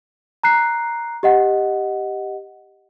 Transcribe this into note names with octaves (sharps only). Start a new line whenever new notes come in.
A#5 F#6 C7
G4 D#5 F#5